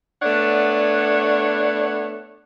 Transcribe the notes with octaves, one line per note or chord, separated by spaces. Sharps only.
A3 B3 D4 C#5 D5 F#5